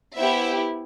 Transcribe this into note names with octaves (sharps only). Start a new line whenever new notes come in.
B3 E4 G4 C5 E5